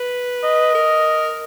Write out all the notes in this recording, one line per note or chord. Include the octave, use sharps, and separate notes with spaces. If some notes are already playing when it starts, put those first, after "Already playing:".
Already playing: B4
D#5
A#4